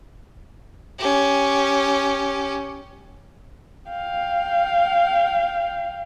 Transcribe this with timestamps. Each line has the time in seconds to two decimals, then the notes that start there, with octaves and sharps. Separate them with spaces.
0.99 C#4 G4
3.90 F5 G5